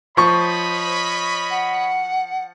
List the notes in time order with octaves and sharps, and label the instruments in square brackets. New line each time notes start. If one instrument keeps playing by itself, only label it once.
[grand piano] F3 C#6 [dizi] C5 [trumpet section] C#5 D#5 B5
[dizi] F#5